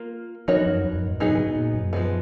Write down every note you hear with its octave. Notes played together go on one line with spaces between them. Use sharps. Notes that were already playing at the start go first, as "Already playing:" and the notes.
Already playing: A#3 F4 A#4
F3 B3 D#4 F#4 A#4 C#5
F#2
F2
F#2
G#2
A#2 F#3 B3 D#4 G#4
C#3
B2
A#2
F#2
F3 G#3 B3